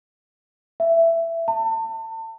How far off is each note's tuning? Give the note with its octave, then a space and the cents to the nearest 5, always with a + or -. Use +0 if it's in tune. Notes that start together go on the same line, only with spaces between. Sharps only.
E5 +15
A5 +35